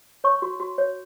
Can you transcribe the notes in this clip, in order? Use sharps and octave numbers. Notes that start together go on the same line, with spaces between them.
C#5 C#6
F#4
F#4
C#5